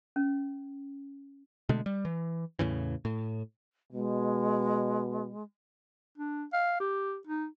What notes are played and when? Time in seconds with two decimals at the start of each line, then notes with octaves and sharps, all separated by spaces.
0.16 C#4
1.69 B2 D3 G#3 A3
1.86 G3
2.05 E3
2.59 E2 A2 C#3 E3
3.05 A2
3.92 B2 G#3
6.18 D4
6.53 F5
6.80 G4
7.27 D#4